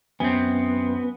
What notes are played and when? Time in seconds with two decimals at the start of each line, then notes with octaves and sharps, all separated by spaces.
0.20 F#2 B3 C4 G#5